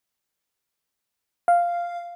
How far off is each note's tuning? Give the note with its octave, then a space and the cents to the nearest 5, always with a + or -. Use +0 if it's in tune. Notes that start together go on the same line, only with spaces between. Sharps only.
F5 -5